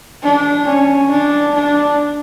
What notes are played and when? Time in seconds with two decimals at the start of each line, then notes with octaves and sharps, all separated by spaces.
0.23 D4
0.67 C#4
1.11 D4
1.55 D4